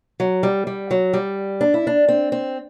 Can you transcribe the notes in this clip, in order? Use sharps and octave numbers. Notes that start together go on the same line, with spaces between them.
F#3
G3
G3
F#3
G3
D4
E4
D4
C4
C4